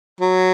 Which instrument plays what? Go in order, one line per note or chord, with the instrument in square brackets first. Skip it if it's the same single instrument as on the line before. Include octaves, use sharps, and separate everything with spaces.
[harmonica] F#3